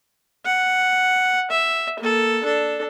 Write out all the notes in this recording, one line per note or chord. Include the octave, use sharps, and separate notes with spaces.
F#5
E5
A#3 A4
D4 A4